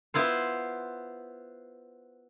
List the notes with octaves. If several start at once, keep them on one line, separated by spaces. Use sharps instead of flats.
B3 E4 F4 C5